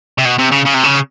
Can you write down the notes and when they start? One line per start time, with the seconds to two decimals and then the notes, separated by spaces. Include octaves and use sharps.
0.18 C3
0.25 B2
0.38 C3
0.51 C#3
0.65 C#3
0.74 C3
0.83 C#3